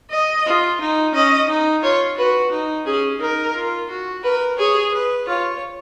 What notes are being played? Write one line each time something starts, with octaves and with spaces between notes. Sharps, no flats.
D#5
F4
D#4
C#4 D#5
D#4
F4 C#5
F#4 B4
D#4
C#4 G#4
D#4 A#4
F4
F#4
A#4 B4
G#4 C#5
B4
F4 C#5